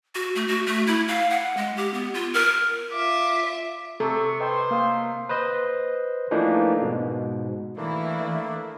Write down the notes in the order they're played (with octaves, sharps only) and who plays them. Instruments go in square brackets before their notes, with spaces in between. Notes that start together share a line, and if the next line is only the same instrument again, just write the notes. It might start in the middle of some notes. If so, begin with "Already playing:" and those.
[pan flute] F#4
A3
F#4
A3
E4
F5
F#5
G#3
G4
B3
F4
A#4
[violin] F4 E5 [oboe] D6
[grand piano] C3 [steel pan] A4 [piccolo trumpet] C#6
[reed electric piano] B4 D#5 G5 [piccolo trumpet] C5
[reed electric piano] A#3 F5 D#6
[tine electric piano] B4 C5 D#5
E3 F3 A3 A#3 D4 D#4
G#2 B2
[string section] E3 E4 [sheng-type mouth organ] A3 A#3 D4